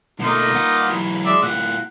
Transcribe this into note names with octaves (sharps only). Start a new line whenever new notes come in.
B2 A3 A#3 D#4 F4
G2 F#5
E3 F#3
G#3 D5 E5
A2 F4 F#5